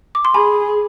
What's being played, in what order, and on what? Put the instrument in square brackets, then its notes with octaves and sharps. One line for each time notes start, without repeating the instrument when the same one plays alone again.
[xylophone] D6
C6
[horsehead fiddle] G#4 [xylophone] G#5 B5